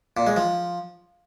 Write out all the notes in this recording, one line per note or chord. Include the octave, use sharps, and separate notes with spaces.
A#2
G#3
F3